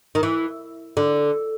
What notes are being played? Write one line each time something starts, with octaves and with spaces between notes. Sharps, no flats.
D#3
E3
D3